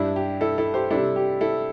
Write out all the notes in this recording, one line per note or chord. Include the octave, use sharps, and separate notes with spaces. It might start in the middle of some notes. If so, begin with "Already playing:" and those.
Already playing: G2 G3 D4 E4
G4
E4 A4
E4 A4
G4 C5
C3 G3 D4 E4 A4
G4
E4 A4